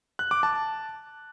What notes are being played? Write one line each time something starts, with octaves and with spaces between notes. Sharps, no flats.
F#6
D6
A5